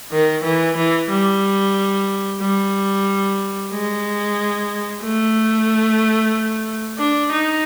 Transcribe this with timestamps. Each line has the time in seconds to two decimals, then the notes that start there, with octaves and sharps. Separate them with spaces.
0.12 D#3
0.44 E3
0.76 E3
1.09 G3
2.41 G3
3.71 G#3
5.03 A3
6.98 D4
7.32 D#4